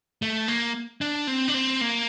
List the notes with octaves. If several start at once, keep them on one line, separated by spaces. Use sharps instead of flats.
A3
A#3
D4
C4
D4
C4
A#3